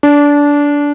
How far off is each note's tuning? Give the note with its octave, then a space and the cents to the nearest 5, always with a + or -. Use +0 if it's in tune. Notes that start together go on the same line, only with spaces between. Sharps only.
D4 -20